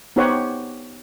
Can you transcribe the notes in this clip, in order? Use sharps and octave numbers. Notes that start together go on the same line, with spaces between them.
B3 D#4 G4 C5 C#5 F#5